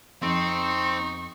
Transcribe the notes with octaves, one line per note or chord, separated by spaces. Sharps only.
F2 C4 D#4 C#6